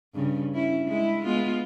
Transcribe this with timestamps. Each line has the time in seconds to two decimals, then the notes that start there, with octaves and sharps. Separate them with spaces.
0.14 G2 C#3
0.54 C#4 E4
0.86 G#3 E4
1.25 G#3 B3 F4